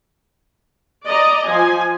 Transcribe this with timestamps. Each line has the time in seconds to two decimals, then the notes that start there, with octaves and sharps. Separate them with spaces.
1.07 D5 D#5 A#5
1.44 F3 G#5